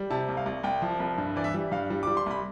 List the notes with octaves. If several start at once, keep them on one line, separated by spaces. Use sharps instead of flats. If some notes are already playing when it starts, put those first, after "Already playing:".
Already playing: G3
C3 A5
C2
F5
C2
C2 G5
F3
C2
G2
E3 D5
E5
G3
G2 F5
G3
G3 D6
C6
C2 B5